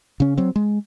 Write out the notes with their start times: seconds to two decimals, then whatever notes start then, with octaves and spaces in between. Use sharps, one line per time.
0.20 C#3 C#4
0.37 F#3 C4
0.56 G#3